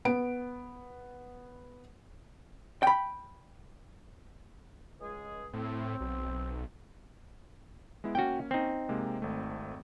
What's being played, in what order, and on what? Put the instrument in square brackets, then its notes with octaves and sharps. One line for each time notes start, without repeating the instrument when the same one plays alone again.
[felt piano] B3 D7
[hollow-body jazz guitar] G5 B5
[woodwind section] C#2 G#3 G#4
[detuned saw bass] A2 [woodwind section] C4
[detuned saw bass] B1
[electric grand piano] G#3 B3 E4
[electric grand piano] A#3 C#4 [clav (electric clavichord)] F#4 G5
[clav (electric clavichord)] C4 D#4
[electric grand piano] C3 G#3 A#3
G#1 A3